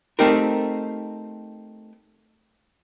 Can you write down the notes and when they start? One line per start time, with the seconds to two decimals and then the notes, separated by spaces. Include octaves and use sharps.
0.19 A3 C4 D#4 G4 A#4